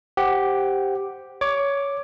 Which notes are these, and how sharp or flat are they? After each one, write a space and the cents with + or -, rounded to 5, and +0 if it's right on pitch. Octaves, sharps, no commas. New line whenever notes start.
G4 +0 C5 +0 F#5 +10
C#5 +15 D6 +0